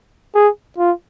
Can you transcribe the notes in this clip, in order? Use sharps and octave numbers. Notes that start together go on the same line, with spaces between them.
G#4
F4